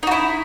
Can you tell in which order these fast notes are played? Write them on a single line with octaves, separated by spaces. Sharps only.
D#4 F#4 E4